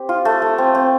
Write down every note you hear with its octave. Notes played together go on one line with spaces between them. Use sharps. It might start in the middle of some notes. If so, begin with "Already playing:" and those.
Already playing: C4 G4
F4
A3
A3
C4
C4